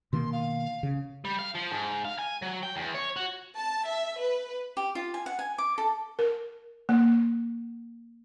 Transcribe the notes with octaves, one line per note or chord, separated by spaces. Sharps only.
B2 D#3 A#3 C6
F5
C#3
G3
F5
F3
G#2
F5
G#5
F#3
G5
E2
C#5
F#4
A5
E5
B4
G4
F4
G#5
F#5
G#5
D6
A4
A#4
A#3